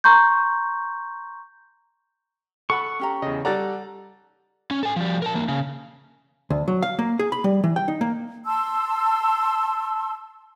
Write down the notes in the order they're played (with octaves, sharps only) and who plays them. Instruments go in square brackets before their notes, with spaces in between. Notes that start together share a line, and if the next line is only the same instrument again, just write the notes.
[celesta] A#5 C6 C#6 G6
[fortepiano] A4 F#5 B5 [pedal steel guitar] C#6
[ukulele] C#4 G4 A#5
[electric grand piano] E2 C#3 [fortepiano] D#5
[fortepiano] G3 A4 D5 [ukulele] F#5 [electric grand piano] A#5 F#6 A6
[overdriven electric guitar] C#4
A4 G#5
F3 G3
A#4 A5
E3 A#3
C#3
[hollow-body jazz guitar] D2
F#3
F5
A#3
G#4
B5
G3
E3
G5
D#4
A#3
[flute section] A5 C6 E6